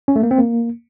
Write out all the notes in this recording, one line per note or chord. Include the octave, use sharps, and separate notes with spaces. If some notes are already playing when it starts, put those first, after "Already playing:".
C#4
A3
A#3
C4
A#3